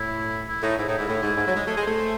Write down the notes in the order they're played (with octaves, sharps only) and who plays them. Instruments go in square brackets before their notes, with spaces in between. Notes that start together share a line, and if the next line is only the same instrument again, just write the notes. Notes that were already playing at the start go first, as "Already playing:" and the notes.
Already playing: [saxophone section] A2 [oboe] E4
[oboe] E4
[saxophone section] A2 [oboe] D#4
[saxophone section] G#2 [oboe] E4
[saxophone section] A2 [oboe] D#4
[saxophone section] G#2 [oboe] E4
[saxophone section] A2
G#2
G#2
F#3
G#3
[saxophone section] A3 [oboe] G#4
[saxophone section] G#3
[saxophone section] A3 [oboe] C5